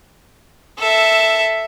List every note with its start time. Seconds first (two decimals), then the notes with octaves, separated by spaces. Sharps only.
0.79 A4 E5